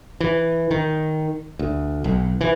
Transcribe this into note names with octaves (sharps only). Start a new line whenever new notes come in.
E3
D#3
D2
B1
E3